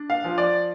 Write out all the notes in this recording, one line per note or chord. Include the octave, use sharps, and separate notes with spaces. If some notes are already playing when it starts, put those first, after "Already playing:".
Already playing: D4
F5
F3
D5